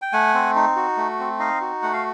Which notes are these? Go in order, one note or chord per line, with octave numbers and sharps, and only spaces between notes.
G5
A3 F#5 G#5
C4
D#4
F#4
A3
C4
D#4 D#5 F5
F#4
A3 F#5
F5